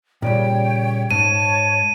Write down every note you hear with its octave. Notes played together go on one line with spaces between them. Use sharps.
A#2 C#3 G3 C#5 G5
G#2 C#5 A5 D#7